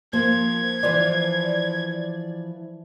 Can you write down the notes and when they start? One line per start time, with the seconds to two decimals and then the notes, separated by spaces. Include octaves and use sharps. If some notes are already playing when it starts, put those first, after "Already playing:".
0.13 F3 A#3 G#6
0.83 E3 F3 D5